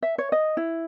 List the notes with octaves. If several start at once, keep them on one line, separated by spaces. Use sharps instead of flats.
E5
C#5
D#5
E4